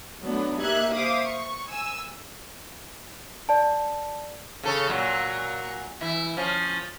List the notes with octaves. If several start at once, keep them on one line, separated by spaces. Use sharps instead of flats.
F#3 A3 B3 D4
A#3 D#4 G4 E5 F#6 G#6
C5 E5 F5 D6 D#6
C#6
G#5 E6
D5 A5
C#3 A4 C#5
A#2 F#3
E3 E4
F3 C#4